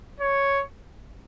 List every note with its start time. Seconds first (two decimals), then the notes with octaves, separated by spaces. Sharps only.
0.20 C#5